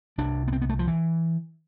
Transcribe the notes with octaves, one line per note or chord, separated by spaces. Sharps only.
C2 C3 D4
B3
C4
B3
A3
F3
E3